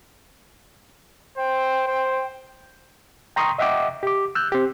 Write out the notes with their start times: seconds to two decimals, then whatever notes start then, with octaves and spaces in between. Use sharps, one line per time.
1.38 C5 G5
1.87 C5
3.36 G5 A#5 C6 C#6 D#6
3.58 D#5 E5 F#5 G5 D6
4.03 G4 D6
4.35 E6 F#6 G6
4.52 C4 G4